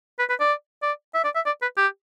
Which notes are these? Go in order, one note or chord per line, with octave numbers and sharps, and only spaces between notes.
B4
B4
D5
D5
E5
D5
E5
D5
B4
G4